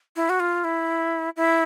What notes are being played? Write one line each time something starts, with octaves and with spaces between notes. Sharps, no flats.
E4
F#4
F4
E4
E4